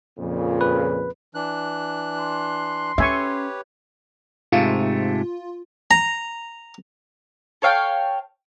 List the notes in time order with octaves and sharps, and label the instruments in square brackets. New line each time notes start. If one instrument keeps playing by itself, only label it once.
[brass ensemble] F2 A#2 C#3
[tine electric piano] B4
[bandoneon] E3 D4 F#6
[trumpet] C6
[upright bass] C#4 [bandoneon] G4 B4 C#5 [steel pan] E5 G#5 C#6
[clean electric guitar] G#2 C3 A3 [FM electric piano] F4
[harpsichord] A#5
[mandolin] A4 C#5 F5 G5